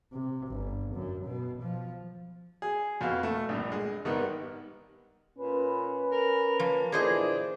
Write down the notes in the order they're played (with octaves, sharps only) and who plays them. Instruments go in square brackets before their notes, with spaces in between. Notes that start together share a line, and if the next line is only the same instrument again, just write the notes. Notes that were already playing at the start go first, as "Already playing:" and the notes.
[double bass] C3
G1
F#2
B2
F3
[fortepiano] G#4
F2 B2 F5
A3
A#1 G2
G#3
G#1 D#3 G3 B3
[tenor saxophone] A#2 [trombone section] C#4 B4
[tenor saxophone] A#4
[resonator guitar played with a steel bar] F3 [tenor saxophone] A#3
[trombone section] A#2 D3 E3 [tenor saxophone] D4 [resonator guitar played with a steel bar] G#4 C5 D#5